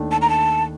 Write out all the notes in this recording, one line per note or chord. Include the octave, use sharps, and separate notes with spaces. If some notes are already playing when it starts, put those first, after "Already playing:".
Already playing: D#2 D#3 A3 D4
A5
A#5
A5